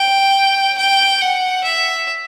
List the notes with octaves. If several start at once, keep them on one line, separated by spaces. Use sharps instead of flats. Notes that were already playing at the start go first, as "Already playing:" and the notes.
Already playing: G5
G5
F#5
E5